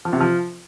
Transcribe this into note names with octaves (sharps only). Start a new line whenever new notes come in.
F3
C3
F3